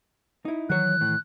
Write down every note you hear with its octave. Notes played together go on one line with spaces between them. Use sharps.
D#4 E4
D#3 E3 F#3 C#5 F#6
A2